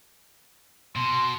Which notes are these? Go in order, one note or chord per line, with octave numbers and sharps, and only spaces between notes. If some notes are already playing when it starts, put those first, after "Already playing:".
B2 C6